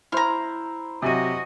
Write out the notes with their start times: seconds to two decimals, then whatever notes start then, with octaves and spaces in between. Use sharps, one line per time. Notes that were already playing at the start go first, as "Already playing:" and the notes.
0.12 E4 C5 A#5 F6
1.02 C3 F#3 F#4 D#5 G#5 D#7